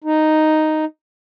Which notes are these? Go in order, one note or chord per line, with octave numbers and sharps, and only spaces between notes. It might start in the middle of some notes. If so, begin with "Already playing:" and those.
D#4